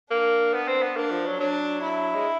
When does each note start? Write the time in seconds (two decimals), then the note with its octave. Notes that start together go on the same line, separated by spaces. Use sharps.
0.11 A#3 D4
0.54 B3
0.68 C4
0.82 B3
0.96 A#3 D4
1.11 F3
1.26 F#3
1.40 F#3 D4
1.83 E4
2.15 G#3